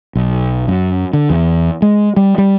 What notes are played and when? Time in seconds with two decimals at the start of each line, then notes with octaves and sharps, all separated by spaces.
0.15 B1
0.68 F#2
1.13 D3
1.30 E2
1.82 G#3
2.16 G3
2.38 G3